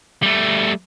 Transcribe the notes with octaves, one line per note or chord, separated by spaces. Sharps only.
G3 A3